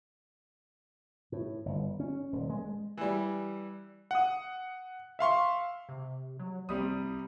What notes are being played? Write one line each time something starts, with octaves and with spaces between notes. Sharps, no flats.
A2
G1
C#4
D#1
G#3
E3 G3
F#5 D#6
E5 F5 C6 C#6
C3
F#3
C2 C3 G3 D#6